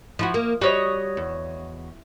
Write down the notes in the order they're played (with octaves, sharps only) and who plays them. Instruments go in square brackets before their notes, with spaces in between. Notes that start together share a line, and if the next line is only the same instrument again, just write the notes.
[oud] F3 E4 F#4
A#3
[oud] G3 [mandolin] F#4 C#5 D#5
[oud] E2